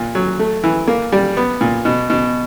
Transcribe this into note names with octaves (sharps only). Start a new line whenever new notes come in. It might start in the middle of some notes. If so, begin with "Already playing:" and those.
Already playing: A#2
F#3
A3
E3
A#3
G3
B3
A#2
B2
B2